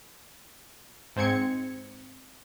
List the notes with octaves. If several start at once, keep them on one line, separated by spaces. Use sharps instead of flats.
G#2 C4 G#6 C#7